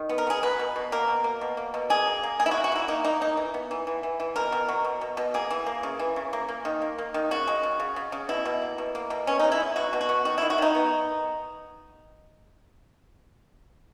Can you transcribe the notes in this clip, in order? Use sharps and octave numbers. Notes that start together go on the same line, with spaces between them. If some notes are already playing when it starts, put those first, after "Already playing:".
Already playing: D#3
B3
A#4
B3 G#4
F#3 B4
B2
B2
A#3 A#4
B2
A#3
B2
A#3
B2
A#3 G#4
A#3
A#3
A#3 G#4
E4
F#4
A#3
F#4
A#3 E4
A#3 D#4
A#3 D#4
A#3 D#4
E3
B3
E3
E3
E3
E3
B2 A#4
B2
F#3
B2
B2
B2
A#3 G#4
E3
A#3
C#3
E3
C#3
A#3
A#3
D#3
A#3
A#3
D#3
C#3 F#4
G#3
C#3
C#3
C#3
C#3
B2 E4
B2
A#3
B2
A#3
B2
B3 C#4
D#4
G#3
E4
G#3
B2 F#4
B2
F#4
B3
D#3 F#4
E4
D#3
F#4
D#3 D#4
B3